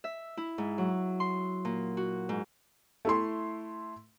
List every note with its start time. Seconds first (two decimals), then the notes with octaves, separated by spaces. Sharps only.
0.04 E5
0.37 E4
0.58 G#2
0.78 F#3
1.20 C6
1.65 A#2
1.97 F#4
2.29 G#2
3.05 A3 E4 C6